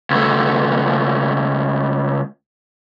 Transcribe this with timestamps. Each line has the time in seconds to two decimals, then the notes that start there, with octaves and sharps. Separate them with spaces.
0.10 C#2 A3